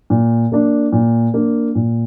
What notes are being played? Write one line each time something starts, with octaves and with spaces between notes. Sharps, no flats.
A#2
A#3 D4
A#2
A#3 D4
A#2